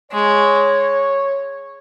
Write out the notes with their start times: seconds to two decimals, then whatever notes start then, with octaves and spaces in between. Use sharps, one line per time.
0.12 G#3 C#5